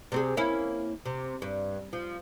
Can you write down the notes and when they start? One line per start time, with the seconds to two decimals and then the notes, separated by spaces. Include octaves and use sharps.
0.12 C3 C4 G#4
0.37 A#3 C#4 E4
1.06 C3
1.42 G2
1.93 F3